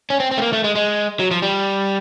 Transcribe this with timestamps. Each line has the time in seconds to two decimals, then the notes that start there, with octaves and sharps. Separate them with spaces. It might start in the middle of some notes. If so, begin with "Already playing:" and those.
0.10 C#4
0.20 C4
0.31 C4
0.38 A3
0.42 A#3
0.53 A3
0.64 G#3
0.75 G#3
1.20 F#3
1.31 F3
1.42 G3